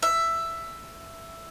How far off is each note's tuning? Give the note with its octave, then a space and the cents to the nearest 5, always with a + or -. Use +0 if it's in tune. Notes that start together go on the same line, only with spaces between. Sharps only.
E5 +10